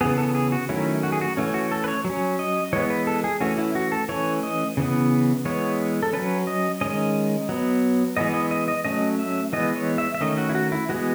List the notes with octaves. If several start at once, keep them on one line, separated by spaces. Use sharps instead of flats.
C#3 E3 B3 G#4
A4
G#4
F#4
D#3 F#3 A3 C#4 E4
F#4
G#4
F#4
E3 A3 C#4
F#4
A4
B4
C#5
F#3
C#4
D#5
E3 G#3 B3 C#5
B4
A4
G#4
E3 A3 C#4 F#4
E4
F#4
A4
E3 A3 C#4 C#5
D#5
C#3 E3 B3
E3 G#3 B3 C#5
A4
F#3 C#4 B4
D#5
D#3 G#3 C#4 D#5
F#3 B3
E3 G#3 B3 D#5
D#5
D#5
D#5
F#3 A3 C#4 D#5
E5
E3 G#3 B3 D#5
C#5
E5
E5
D#3 A3 C#4 D#5
F#4
E4
F#4
E4
E3 G#3 B3 F#4